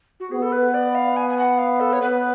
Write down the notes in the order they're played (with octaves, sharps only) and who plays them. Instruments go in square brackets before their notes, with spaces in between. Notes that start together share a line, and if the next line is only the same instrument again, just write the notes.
[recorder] F#4
[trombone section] B3 [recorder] G#4
[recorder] A4
B4
D5
F5
G#5
G#5
F#5
F5
A4
C#5
[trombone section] B3 [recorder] B4